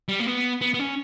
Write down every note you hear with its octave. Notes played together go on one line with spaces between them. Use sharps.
G3
A#3
B3
B3
B3
C#4